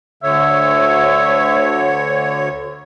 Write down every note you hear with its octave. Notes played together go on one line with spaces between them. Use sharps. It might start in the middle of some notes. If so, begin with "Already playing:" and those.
D2 D3 C#5 E5